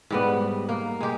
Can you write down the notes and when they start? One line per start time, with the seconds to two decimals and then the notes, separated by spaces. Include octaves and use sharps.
0.11 G#2 G3 B3
0.69 A#3
1.01 G#3 G4